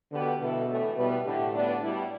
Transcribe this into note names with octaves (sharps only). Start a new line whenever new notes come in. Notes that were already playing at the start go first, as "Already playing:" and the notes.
B2 D3 B3 G4 B4
G2 B2 G3 E4 A4
A2 E3 A3
B2 G3 B3 E4 B4
A2 D3 A3 G4
G2 D3 B3 D4
B2 G3 E4